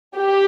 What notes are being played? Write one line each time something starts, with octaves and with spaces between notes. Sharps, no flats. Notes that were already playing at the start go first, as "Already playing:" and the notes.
G4